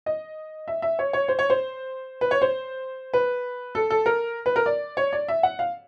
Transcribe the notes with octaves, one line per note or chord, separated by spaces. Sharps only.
D#5
E5
E5
C#5
C#5
C5
C#5
C5
B4
C#5
C5
B4
A4
A4
A#4
B4
A#4
D5
C#5
D5
E5
F#5
F5